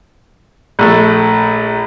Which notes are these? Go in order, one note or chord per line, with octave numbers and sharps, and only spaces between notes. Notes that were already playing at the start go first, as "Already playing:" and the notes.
A#1 A3